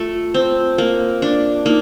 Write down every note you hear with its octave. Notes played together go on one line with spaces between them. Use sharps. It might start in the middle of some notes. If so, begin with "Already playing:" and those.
Already playing: A3 F4
C4
A#3
D4
A#3 D#4